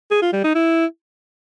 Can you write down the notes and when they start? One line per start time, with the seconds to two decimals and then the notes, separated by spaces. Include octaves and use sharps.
0.11 G#4
0.22 F4
0.33 G3
0.44 D#4
0.55 E4